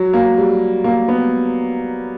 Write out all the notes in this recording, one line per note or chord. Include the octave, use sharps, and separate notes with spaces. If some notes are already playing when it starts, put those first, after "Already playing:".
Already playing: F#3
A#3
G3
A#3
B3